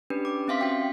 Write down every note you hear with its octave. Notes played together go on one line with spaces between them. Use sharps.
C#4 D4 G4 B4
D6
C4 C#4 E5 F5 C6 B6
C#4 F#4 G5